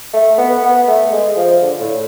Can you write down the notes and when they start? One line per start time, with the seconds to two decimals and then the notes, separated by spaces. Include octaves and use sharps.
0.14 A3
0.38 B3
0.63 B3
0.88 A3
1.12 G#3
1.37 F3
1.61 D3
1.80 A2